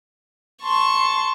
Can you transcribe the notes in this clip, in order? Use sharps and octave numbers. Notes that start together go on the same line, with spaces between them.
A5 C6 C#6